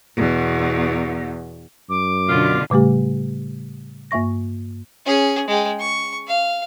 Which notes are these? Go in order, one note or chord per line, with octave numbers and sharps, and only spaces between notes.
E2 B2
F#2 D6
B2 D3 F4
A2 C#3 G3 A3 G4
G2 A#3 E5 C#6 A#6
C#4 G#4
G#3 G5
C#6
F5